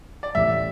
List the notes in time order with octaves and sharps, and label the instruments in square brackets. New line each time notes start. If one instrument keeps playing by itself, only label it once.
[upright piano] D5
[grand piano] A1 A2 G3 [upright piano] E5